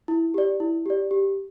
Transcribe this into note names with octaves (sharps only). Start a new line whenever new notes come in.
E4
G4 D5
E4
G4 D5
G4